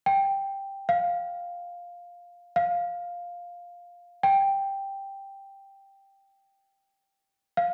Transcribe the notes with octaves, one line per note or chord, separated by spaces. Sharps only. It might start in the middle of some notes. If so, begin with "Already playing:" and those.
G5
F5
F5
G5
F5